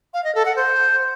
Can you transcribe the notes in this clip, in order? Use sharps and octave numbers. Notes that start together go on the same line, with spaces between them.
F5
D#5
A4
F#5
C5